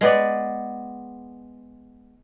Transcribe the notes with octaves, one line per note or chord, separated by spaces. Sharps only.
G#3 B3 D5